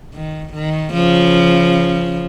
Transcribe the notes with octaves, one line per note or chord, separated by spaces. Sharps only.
D#3
D#3
C#3 F3